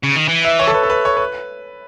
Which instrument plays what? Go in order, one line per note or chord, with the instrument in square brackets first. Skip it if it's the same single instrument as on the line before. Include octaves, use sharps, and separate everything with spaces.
[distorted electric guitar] C#3
D#3
E3
[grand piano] E5
C#5
A4
B4
A4
B4
C#5
B4